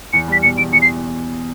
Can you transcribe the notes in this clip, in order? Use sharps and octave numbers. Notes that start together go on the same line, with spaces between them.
E2 C#7
G3 B6
B2 C#7
E2 D7
E2 C#7
C7